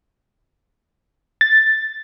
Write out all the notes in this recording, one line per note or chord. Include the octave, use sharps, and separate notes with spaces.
A6